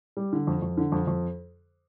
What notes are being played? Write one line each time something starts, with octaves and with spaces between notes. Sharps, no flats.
G3
D3
F2
F2
D3
F2
F2